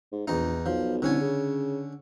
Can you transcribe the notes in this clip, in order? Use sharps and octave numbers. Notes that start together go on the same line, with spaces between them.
G#2
A#1 E2 D#4
B1 F3
C2 D3 C#4 G#5
C#3